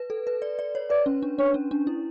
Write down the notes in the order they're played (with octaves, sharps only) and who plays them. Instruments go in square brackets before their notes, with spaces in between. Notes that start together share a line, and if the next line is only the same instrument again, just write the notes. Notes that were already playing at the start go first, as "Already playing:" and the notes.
Already playing: [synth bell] B4
A4
B4
D5
D5
C#5
[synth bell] B4 [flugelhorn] D5
[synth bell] C#4
D4
[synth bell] D4 [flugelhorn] C#5
[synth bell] C#4
D4
E4